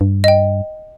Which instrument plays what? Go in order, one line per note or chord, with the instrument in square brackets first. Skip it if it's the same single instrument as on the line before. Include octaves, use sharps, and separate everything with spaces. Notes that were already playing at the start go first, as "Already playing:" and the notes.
[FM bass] G2
[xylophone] D#5 G5